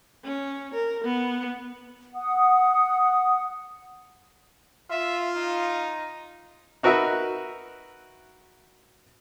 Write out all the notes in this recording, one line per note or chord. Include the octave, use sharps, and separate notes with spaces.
C#4
A#4
B3
F#5 D#6
F4 E5
D#4
D#4 F#4 A#4 B4 E5